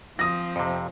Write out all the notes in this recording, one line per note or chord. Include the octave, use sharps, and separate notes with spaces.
F3 C4 D#6 A#6
F2 C3